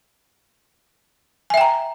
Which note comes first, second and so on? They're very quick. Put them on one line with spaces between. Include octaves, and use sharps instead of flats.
G#5 E5 G5 A#5